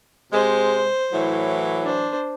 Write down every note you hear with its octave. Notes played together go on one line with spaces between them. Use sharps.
C3 G#3 C5
A2 E3 F#3
D4 C5